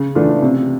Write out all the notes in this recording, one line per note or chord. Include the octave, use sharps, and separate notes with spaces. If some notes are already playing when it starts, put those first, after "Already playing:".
Already playing: C#3
E3 A3 D4 F4
C3